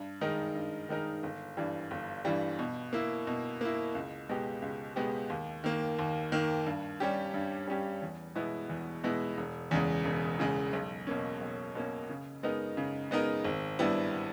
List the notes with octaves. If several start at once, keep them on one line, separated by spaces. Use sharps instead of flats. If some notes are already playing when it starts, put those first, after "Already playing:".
Already playing: G2
D#3 G#3 D#4 A#4
G2
D#3 G#3 D#4 A#4
G1
G2 E3 G3
G1
G2 E3 G3
B2
A#3 E4
B2
A#3 E4
C#2
B2 G#3 B3 G4
C#2
B2 G#3 B3 G4
D#2
D#3 A#3
D#2
D#3 A#3
G2
G3 C#4 G4
G2
G3 C#4 G4
E2
B2 G#3 B3 E4
E2
B2 G#3 B3 E4
E1
E2 C#3 G#3
E1
E2 C#3 G#3
B1
B2 A#3 C#4
B1
B2 A#3 C#4
C#3
G#3 B3 D#4 A#4
C#3
G#3 B3 D#4 A#4
G#1
G2 G3 B3 E4